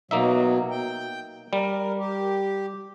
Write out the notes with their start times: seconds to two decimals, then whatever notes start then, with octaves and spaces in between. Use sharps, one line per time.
0.11 B2 F#3 A#3 D#4 E5
0.70 G5
1.53 G3 A#4
1.98 G4